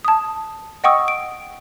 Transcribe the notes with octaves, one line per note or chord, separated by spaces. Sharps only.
A5 D#6
D#5 F#5 G5 C#6 D#6 E6
D7